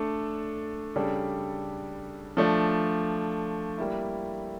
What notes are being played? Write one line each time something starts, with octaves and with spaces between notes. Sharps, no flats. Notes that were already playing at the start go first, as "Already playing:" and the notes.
Already playing: A3 D4 A4
C#3 G3 D4 A4
F3 A3 D4
G3 A#3 E4